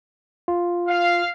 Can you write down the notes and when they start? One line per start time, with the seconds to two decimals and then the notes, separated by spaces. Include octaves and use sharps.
0.48 F4
0.88 F5